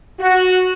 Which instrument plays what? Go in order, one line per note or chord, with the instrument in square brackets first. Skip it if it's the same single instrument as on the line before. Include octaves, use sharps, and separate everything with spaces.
[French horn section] F#4